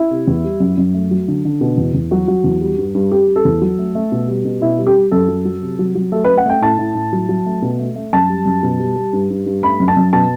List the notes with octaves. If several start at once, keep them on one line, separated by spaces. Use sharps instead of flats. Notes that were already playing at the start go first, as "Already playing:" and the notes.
Already playing: E4
C3
E2
G3
F#2
F#2
A3
F#3
D3
D3
B2
E2
E2
F#3 F#4
F#3
E2
G3
G2
G2
G3 G4
G3
A4
E2
F#3
A3
A3
B2
G3
B2
B2 E4
G3
G4
G3
F#2 A4
F#3
F#3
C3
F#3
F#3
A3 A4
B4
A3
F#5
A3 G5
A2 A5
A2
A2
F#3
F#3
A3
B2
A3
A3
F#2 A5
G3
F#2
B2
G3
G3
G2
G2
G2
A3 B5
F#2
A5
F#2
B2 A5